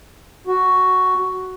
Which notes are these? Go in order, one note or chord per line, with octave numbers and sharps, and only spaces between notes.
F#4